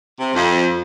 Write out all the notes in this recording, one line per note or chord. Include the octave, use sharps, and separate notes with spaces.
C3
F2